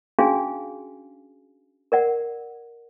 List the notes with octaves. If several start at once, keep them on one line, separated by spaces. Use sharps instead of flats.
C#4 D4 F#4 G#4 F5 G#5
A#4 D5 F#5